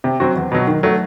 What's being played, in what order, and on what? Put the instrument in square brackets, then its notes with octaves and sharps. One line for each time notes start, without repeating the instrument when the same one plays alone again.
[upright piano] C3
F#3 C4 F#4
E2
B2 F#3
D#3
F#3 A3